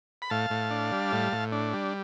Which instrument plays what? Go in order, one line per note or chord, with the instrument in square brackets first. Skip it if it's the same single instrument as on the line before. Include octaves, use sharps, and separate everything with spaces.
[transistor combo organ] B5
A2 F5 A5
A2
D4
G3
A2
A2
D4
G3